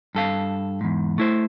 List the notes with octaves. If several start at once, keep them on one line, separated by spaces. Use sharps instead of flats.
G2 A4 F5
E2 G#2
A3 E4 C5